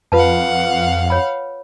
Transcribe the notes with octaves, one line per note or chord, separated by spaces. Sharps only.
F2 F4 B4 F5 F#5 A5
C#5 B5